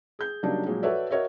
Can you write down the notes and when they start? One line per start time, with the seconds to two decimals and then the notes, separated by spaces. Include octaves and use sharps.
0.19 G#4 G6
0.43 C#3 F#3 G3 A#3 D4 D#4
0.66 A#2 F3 F#3 G#3
0.83 F#4 A4 B4 C#5 D5 E5
1.11 F#4 A#4 C#5 D#5 E5